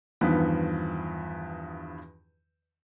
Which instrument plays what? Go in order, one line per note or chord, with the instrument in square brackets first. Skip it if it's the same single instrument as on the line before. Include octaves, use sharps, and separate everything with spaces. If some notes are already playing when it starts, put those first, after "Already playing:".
[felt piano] E2 G2 D#3 F3 B3